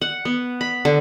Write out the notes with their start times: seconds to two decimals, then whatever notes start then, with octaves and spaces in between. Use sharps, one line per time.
0.01 F#5
0.25 B3
0.61 B5
0.85 D3